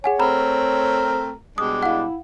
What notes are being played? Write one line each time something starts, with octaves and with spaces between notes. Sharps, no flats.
G#4 C#5 F#5 G#5
A3 C4 A#4 A#5 B5
B2 G3 G#3 D4 D#6
E4 F5 F#5